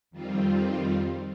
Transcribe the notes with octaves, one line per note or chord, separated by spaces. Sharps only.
F2 D#3 G3 C4 F4